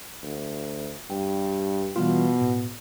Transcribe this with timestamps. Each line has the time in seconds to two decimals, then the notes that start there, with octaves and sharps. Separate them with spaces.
0.22 D2
1.10 G2 G5
1.96 B2 E3 G3 F4
2.41 A2